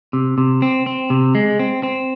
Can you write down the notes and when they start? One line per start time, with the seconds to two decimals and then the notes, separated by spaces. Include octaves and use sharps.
0.13 C3
0.38 C3
0.62 C4
0.86 C4
1.10 C3
1.35 G#3
1.59 C4
1.83 C4